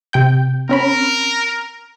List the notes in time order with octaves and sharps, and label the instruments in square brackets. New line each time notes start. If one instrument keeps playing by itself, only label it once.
[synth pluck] C3 G5 G6
[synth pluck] C4 C#4 B5 [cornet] A#4